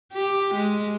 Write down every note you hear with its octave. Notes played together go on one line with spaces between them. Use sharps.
G4
G#3